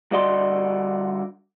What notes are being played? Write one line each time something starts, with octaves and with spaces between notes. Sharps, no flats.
G2 D3 F#4 D5 D#5 C6